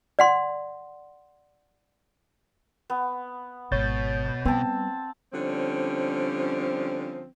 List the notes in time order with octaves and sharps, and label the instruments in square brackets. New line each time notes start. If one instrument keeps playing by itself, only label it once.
[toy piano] D5 F#5 C6
[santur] B3
[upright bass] G#1 [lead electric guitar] B2 [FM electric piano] C#5 G6 A6
[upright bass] G3 [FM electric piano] B3 [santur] C4 A5
[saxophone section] D3 F3 G3 C4 C#4